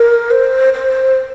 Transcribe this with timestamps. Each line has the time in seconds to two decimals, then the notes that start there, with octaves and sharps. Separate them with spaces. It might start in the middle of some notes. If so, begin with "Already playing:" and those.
Already playing: A#4
0.30 C5
0.73 C5